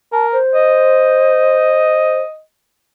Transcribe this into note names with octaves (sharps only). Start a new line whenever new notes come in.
A#4 A5
C5
D#5